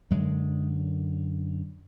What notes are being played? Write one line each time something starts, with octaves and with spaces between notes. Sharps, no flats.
F#2 D3 F#3 G#3